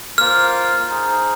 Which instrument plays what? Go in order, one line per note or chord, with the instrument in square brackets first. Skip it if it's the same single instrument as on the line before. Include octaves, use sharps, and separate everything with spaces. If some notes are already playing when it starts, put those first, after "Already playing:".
[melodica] A#3 F4 C5 F5 [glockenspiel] F6
[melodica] D#4 G#4 C5